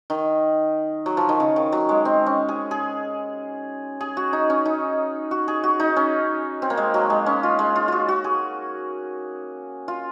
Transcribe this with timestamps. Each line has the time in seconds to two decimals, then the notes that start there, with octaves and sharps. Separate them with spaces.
0.10 D#3
1.06 F#3
1.17 F3
1.29 D#3
1.40 C#3
1.56 D#3
1.72 F#3
1.89 G#3
2.05 C4
2.26 C#4
2.49 G#4
2.71 G#4
4.01 G#4
4.17 F#4
4.33 D#4
4.50 C#4
4.65 D#4
5.31 F#4
5.48 G#4
5.64 F#4
5.80 D#4
5.97 C#4
6.62 C4
6.70 A#3
6.77 G#3
6.94 F#3
7.10 G#3
7.26 C#4
7.43 F4
7.59 G#3
7.76 F4
7.88 F4 F#4
8.08 F#4
8.24 G#4
9.88 F4